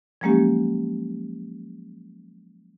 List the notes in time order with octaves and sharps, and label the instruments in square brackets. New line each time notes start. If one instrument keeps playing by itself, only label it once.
[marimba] F3 F#3 G#3 A#3 C#4 G4